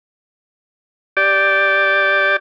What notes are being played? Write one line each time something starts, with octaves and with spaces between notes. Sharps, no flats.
G4 D5